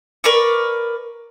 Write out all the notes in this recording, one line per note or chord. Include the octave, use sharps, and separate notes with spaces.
A#4 B4 D5 C#6